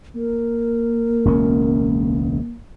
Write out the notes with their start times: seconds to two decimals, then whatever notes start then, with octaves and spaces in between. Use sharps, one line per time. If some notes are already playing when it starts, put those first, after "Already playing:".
0.15 A#3 A#4
1.25 E1 C#2 C#4